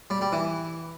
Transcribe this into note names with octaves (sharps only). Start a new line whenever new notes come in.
G3
G3
E3